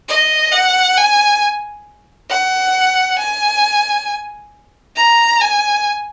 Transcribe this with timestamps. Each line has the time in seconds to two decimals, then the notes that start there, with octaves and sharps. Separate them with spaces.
0.08 D#5
0.52 F#5
0.97 G#5
2.30 F#5
3.18 G#5
4.96 A#5
5.41 G#5